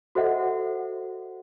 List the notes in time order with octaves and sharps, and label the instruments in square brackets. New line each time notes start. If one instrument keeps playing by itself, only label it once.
[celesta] F#4 A4 C5 D#5 E5 F#5